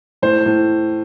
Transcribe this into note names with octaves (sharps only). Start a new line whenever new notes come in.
A2 C5
A2